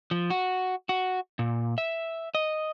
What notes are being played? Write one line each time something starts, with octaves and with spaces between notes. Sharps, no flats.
F3
F#4
F#4
A#2
E5
D#5